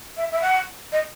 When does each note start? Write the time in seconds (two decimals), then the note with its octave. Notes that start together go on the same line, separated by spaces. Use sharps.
0.17 E5
0.31 E5
0.41 F#5
0.92 D#5